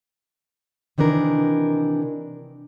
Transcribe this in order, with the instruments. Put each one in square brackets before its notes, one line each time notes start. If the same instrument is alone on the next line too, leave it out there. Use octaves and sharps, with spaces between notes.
[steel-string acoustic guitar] C3 D#3 E3 D4 A#4